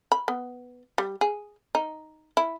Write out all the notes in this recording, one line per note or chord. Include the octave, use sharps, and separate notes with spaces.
B5
B3
G3
G#4
D#4
E4